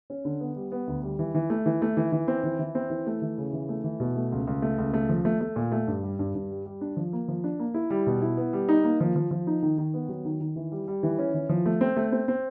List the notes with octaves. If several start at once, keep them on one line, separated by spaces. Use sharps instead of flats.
C#4
D3
B3
G3
B3
D2
G3
E3
E3
A3
E3
A3
E3
E3
C4
E3
E3
C4
E3
A3
E3
C#3
E3
A3
E3
B2
A3
C#2
C#2
A3
C#2
A3
F3
A3
A3
A#2
A3
G2
G3
G2
G2
G3
G3
D4
F3
A#3
F3
D4
A#3
E4
G3
B2
E4
B3
G3
D#4
A#3
F3
F3
F3
D#4
D#3
D#3
B3
F#3
D#3
D#3
E3
G3
G3
E3
C#4
E3
F3
A3
C4
A3
C4
C4